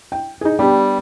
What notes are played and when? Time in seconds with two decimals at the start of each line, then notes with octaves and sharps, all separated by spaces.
0.12 G5
0.41 D#4 G#4
0.59 G3 B3 D4 G4